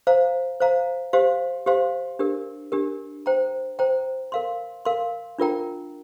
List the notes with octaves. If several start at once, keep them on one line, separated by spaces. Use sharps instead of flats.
C5 F5 A#5
C5 F5 A#5
G4 C5 F5 C6
G4 C5 F5 C6
D4 G4 A#4
D4 G4 A#4
C5 G5 A#5
C5 G5 A#5
A#4 F5 C6
A#4 F5 C6
D4 F4 A#4 G5 A#5